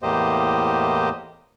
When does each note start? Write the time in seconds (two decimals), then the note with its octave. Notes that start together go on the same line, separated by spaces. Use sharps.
0.03 E2 A2 A#3 G4 C5 D#5